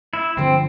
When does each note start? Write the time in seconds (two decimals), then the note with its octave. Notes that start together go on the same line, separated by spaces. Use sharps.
0.13 E4
0.37 G2 D3 F3 C4